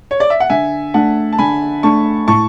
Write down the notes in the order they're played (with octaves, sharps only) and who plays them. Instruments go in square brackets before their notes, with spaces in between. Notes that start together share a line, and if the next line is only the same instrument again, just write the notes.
[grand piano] C#5
D5
E5
F#5
[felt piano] D3 [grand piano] E5 G#5
[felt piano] A3 D4 [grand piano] F#5 A5
[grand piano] A5
[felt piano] D3 [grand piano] G#5 B5
[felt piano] A3 D4 [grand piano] A5 C#6
[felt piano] A2 [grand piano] A5 C#6